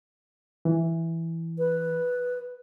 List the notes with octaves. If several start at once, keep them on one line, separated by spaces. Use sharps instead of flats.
E3
B4